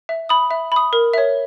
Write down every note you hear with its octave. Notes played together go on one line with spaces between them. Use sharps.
E5
B5 D#6
E5
B5 D#6
A#4
C#5 E5